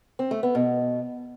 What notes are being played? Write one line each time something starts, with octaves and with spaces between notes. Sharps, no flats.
C4
A3
B3
B2